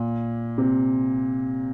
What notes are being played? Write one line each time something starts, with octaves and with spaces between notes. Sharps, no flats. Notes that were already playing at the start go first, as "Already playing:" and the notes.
Already playing: A#2
C3